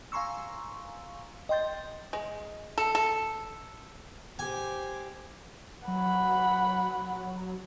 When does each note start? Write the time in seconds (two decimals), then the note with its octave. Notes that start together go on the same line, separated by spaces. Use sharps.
0.12 F5 G#5 A#5 C6 C#6 E6
1.49 D#5 G5 C6 G6 A6
2.13 G#3
2.78 A4
2.95 A4
4.39 G4 C5 G#5
5.88 F#3 F#5 B5